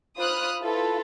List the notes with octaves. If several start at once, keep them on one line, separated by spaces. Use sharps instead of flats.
F4 C5 B5 D#6 F6 F#6
E4 F4 A4 B4